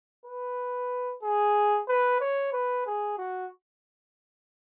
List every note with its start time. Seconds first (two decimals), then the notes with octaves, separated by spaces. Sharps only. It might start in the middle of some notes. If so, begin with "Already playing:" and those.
0.26 B4
1.23 G#4
1.88 B4
2.21 C#5
2.53 B4
2.86 G#4
3.18 F#4